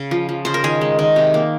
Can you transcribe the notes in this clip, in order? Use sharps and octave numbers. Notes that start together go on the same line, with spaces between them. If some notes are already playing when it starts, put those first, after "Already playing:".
Already playing: C#3
F3
F3
C#3 C5
A#4
D#3 G#4
G#3
D#3
C3
A#3